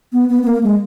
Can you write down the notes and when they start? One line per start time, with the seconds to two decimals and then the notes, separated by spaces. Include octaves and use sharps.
0.13 B3
0.29 B3
0.43 B3
0.47 A#3
0.63 G#3